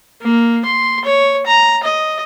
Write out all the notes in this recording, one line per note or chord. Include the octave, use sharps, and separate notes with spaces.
A#3
C6
C#5
A#5
D#5